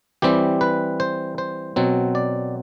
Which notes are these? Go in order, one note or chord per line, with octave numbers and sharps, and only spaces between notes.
E3 G3 C4 G4
B4
C5
C5
B2 F#3 C4
D5